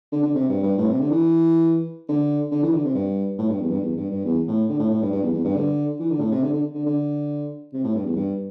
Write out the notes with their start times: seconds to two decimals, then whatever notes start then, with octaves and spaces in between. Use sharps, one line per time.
0.12 D3
0.23 D3
0.35 C3
0.49 G2
0.63 G2
0.78 A2
0.89 C3
1.00 D3
1.10 E3
2.09 D3
2.52 D3
2.63 E3
2.74 D3
2.85 C3
2.95 G2
3.38 A2
3.50 G2
3.61 E2
3.71 G2
3.82 E2
3.97 G2
4.11 G2
4.25 E2
4.48 A2
4.70 D3
4.79 A2
4.90 A2
5.02 G2
5.12 G2
5.23 E2
5.34 E2
5.45 G2
5.56 D3
6.00 E3
6.11 D3
6.20 A2
6.32 C3
6.42 D3
6.54 D3
6.75 D3
6.86 D3
7.73 C3
7.84 A2
7.95 G2
8.05 E2
8.16 G2